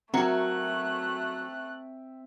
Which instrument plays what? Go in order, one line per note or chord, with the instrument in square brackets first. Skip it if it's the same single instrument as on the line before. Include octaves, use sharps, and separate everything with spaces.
[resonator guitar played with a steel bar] F#3 F#4 A#4 [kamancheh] A3 F#6 [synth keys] C4 E5 G5